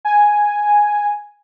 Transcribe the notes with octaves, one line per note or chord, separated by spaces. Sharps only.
G#5